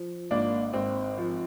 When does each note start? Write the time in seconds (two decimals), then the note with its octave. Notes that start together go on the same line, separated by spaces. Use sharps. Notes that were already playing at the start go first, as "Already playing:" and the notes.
Already playing: F3
0.31 G#1 A#3 D4
0.73 G#1 C4
1.18 F3